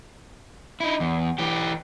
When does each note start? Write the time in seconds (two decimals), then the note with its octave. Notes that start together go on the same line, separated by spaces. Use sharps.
0.80 D#4 E4
1.00 E2
1.38 E3 G4